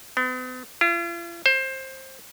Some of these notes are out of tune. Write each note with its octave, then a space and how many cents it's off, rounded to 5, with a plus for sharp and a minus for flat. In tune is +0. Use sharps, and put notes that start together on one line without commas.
B3 +45
F4 -45
C5 +20